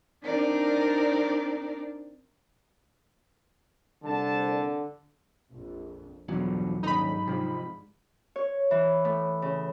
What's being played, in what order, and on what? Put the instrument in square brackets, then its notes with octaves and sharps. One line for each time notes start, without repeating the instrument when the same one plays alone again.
[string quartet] C4 D4 D#4 A#4 D5
[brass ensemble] C2 A5 [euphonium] D3
[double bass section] A#1 F2
[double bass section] A1 G2 F3 [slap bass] E2 B2 D3 [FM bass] F#3
[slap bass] D#1 [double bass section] G#2 D3 [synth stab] D#4 B5
[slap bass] C3 F3
[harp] C#5
E3
A2
C#3